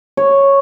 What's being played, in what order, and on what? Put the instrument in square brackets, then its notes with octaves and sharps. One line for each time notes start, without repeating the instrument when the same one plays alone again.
[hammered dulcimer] C#5